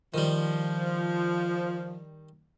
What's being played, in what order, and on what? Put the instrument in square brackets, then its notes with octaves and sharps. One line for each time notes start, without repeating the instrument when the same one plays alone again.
[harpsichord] D#3 G3 [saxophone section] F3